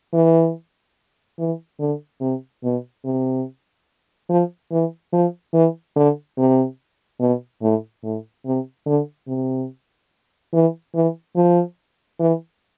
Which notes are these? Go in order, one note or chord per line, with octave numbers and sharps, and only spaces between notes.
E3
E3
D3
C3
B2
C3
F3
E3
F3
E3
D3
C3
B2
A2
A2
C3
D3
C3
E3
E3
F3
E3